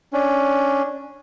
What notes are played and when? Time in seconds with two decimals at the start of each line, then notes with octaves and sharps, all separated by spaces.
0.13 C#4 D4